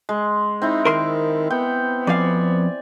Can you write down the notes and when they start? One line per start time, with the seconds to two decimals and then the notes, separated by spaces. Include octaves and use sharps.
0.09 G#3
0.62 C4 D#4 E4
0.85 D#3 A#4 C6
1.50 B3 G5
2.07 F2 D5 F5 G#5